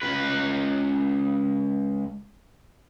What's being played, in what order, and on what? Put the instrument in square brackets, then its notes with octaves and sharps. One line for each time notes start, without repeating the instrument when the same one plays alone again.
[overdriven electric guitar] C#2 B4